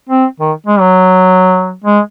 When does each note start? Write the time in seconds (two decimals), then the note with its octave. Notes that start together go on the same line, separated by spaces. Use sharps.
0.10 C4
0.40 D#3
0.66 G#3
0.80 F#3
1.84 G#3